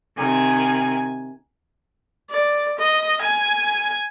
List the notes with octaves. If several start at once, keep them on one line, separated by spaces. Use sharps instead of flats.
C3 D#3 G#5
D5
D#5
G#5